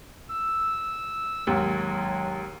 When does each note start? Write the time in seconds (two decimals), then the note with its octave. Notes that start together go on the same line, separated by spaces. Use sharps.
0.29 E6
1.47 D#2 G#2 F#3